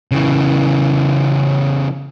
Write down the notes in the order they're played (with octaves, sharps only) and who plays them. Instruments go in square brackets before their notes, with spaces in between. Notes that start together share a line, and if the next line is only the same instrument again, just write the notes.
[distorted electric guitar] C#3 E3